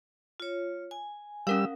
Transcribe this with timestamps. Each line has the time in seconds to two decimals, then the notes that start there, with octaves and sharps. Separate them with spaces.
0.40 F4 C#5
0.91 G#5
1.47 G3 C#4 A#4 F5 E6